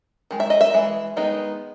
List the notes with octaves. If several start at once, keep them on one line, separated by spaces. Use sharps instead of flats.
D#3 G#3
E5
D#5
E5
E3 G#3
D#3 G#3 B3 D#4